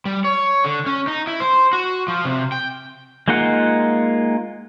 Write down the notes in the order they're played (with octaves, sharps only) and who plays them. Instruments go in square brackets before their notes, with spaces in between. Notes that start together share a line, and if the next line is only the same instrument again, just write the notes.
[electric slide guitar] G3
C#5
D3
C#4
D#4
E4
C5
F#4
F3
C3
G5
[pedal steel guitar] G#3 A#3 D#4 F4 F#5